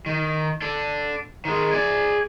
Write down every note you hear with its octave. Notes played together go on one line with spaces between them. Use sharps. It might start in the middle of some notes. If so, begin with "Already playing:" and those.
D#3
D4 A4
D#3 G#3
G#4 D5